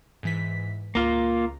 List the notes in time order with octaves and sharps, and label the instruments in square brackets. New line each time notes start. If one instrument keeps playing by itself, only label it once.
[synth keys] G#2 E3 B6
[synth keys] C#2 A#5 [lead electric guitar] A#3 F4